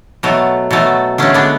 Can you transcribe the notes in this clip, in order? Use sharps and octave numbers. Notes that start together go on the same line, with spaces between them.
B2 F#3 A3
B2 F#3 A3
D3 G#3 A3 C#4
B3 D4